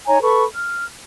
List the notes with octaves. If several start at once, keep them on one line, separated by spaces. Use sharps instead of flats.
D#4 C#5 G#5 A#5
A4 B4 B5 C#6
F6